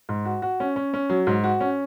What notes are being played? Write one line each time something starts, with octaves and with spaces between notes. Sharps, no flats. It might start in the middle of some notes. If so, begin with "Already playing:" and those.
G#2
F#4
F#4
C#4
C#4
C#4
F#3
G#2
F#4
C#4